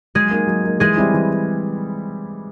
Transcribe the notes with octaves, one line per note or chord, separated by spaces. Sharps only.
F#3 G#3 G#4
A#3 D#4
F#3
A#3 D#4
E3 G#3 G#4
G3 C4 E4
E3